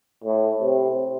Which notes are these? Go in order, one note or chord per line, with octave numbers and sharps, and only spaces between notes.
A2
C3